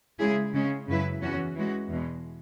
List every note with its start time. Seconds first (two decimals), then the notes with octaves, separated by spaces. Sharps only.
0.19 C#3 G#3 E4 G#4
0.53 C#3 G#3 C#4
0.88 F#2 C#3 F#3 E4 B4
1.22 E2 E3 C#4 F#4
1.55 E3 G#3 C#4 F#4
1.90 E2 B2 G#3